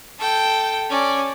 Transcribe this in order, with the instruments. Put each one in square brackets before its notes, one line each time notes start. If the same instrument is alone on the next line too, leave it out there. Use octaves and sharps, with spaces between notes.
[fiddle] A4 G5
C#4 D5